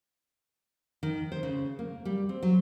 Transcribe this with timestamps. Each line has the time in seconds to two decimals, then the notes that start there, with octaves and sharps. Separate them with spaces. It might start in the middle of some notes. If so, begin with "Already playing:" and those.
1.03 D#3
1.32 C5
1.43 C#3
1.79 A#3
2.05 G3
2.29 C4
2.43 F#3